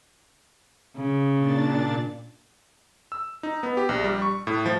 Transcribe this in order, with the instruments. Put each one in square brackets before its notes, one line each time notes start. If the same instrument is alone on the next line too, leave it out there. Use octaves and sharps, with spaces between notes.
[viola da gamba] C#3
[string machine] A#2 D4 A6
[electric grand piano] E6
D#4
B3
G4
A#1
G3
C#6
A2
F3